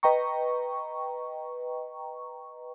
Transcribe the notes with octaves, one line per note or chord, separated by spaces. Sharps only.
B4 D#5 G5 A#5 C#6